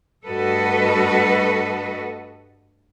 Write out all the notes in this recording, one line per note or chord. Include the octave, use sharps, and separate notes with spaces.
G2 A3 F#4 A4 B4 D#5